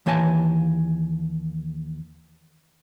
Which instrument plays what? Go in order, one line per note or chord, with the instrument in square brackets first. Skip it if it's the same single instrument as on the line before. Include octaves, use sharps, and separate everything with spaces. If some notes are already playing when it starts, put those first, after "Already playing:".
[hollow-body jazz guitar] D#2 E3 A#3 C#5 G#5 A5